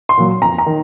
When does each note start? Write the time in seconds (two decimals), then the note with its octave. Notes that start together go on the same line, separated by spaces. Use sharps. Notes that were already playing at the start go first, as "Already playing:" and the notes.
0.09 C6
0.18 A#2 F#3
0.42 F2 A#5
0.58 A#5
0.66 D#3